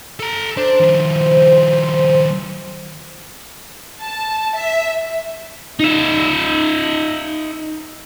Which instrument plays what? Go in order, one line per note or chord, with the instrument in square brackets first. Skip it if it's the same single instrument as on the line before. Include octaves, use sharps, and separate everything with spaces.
[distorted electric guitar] A4 A#5
[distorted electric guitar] D4 [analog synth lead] C5
[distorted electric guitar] D#3 F3
[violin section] A5
E5
[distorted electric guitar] D#4 E5